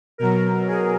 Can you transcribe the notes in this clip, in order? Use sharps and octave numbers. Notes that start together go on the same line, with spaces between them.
B2 F#3 A#4
G#4